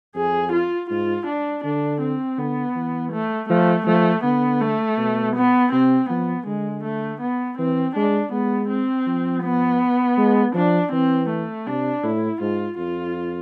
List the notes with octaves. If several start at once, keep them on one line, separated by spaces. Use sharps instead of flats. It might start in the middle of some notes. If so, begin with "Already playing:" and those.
F2 G#4
F4
G#2 F4
D4
D3 D4
C4
D3 B3
E3
A3
F3 A3
F3 A3
D3 B3
A3
B2
B3
C3 C4
F3 B3
D3 G#3
A3
B3
E3 C4
G#3 D4
G#3 B3
C4
F3
B3
G#3
F3 D4
E3 C4
A3
C3 D4
A2 E4
G#2 F4
F2 F4